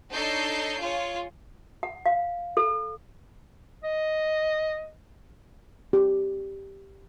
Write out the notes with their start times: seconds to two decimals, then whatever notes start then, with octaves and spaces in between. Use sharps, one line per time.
0.12 D4 D#4 A4 C#5 G6 C7
0.80 F4 G#4 C#5
1.83 F#5
2.06 F5
2.57 A4
3.83 D#5
5.93 G4